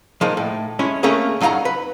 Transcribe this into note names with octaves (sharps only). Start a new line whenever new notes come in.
F3 G#3 A#3 D#4
A2
G#3 C#4 E4
A3 A#3 C#4 G#4
G2 F#3 D#4 F5 F#5 A#5
B4